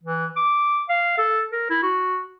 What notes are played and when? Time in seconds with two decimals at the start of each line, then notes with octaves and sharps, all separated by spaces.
0.03 E3
0.36 D6
0.89 F5
1.18 A4
1.52 A#4
1.70 E4
1.83 F#4